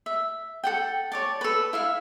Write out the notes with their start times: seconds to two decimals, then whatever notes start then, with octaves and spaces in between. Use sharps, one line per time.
0.06 E5
0.64 A4 F#5 G5
1.12 C#5 D5 A5
1.41 A4 B4
1.73 E4 E5 F5